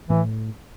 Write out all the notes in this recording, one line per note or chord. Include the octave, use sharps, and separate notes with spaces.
A2 E3